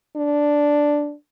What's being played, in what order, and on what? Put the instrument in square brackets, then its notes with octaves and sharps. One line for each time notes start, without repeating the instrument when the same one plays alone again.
[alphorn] D4